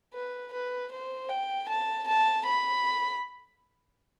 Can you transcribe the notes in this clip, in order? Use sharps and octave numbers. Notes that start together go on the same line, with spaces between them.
B4
B4
C5
G5
A5
A5
B5